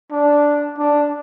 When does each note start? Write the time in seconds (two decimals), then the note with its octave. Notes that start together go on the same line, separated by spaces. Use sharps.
0.11 D4
0.78 D4